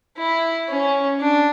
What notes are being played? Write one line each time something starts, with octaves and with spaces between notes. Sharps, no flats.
E4
C#4
D4